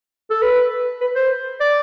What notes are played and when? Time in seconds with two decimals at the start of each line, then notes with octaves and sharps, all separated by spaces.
0.30 A4
0.42 B4
1.01 B4
1.15 C5
1.60 D5